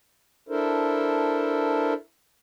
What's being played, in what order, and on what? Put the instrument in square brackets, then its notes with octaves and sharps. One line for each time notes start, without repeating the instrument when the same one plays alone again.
[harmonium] D4 E4 A4 A#4 C5